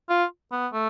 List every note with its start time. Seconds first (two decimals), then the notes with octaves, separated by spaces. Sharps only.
0.09 F4
0.52 B3
0.73 A3